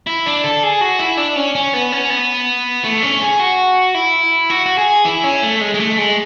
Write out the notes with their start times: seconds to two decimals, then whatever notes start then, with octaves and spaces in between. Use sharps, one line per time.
0.07 E4
0.26 D4
0.44 A4
0.63 G#4
0.81 F#4
0.99 E4
1.17 D4
1.36 C#4
1.55 C#4
1.74 B3
1.92 C#4
2.10 B3
2.84 A3
3.03 C#4
3.21 G#4
3.40 F#4
3.94 E4
4.50 F#4
4.66 F#4
4.78 G#4
5.05 E4
5.24 C#4
5.42 A3
5.61 G#3
5.74 G#3
5.80 A3
5.98 G#3